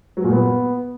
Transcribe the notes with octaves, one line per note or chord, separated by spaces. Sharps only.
F#3
A#2
B3